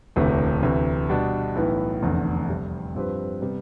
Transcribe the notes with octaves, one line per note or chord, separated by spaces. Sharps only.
E1 D2 C3 E3 A3
D2 C3 E3
B2 G3 B3 D4
B1 A2 E3 B3 E4
F1 E2 D3 A3
F2 C3 G3
G2 F3 C4 G4 B4
C3 G3 B3